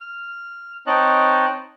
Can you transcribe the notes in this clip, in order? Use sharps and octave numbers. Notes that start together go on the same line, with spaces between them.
F6
C4 D#4 C#5 D#5 A5 F#6